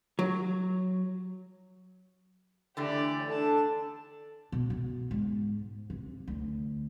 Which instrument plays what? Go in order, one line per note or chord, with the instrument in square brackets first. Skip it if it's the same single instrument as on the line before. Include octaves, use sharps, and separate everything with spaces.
[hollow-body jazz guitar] F#3
[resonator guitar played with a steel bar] D3 E3 A3 [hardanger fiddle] G4 D5
[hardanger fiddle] D4 A5 [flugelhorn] A4
[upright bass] B2
B2
G#2
C3
D2